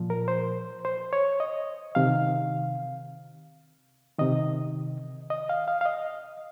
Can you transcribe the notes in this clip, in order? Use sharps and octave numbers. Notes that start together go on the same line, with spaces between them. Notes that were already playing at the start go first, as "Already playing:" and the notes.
Already playing: A#2 F3
A#4
C5
C5
C#5
D#5
C3 D#3 F5
C3 D#3 D#5
D#5
F5
F5
F5
D#5